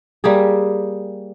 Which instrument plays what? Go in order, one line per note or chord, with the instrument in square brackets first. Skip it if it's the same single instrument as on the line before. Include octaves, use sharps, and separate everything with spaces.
[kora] G3 A#3 G4 G#4